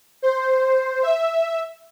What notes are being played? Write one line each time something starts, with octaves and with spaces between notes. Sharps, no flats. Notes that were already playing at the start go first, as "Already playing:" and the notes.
C5
E5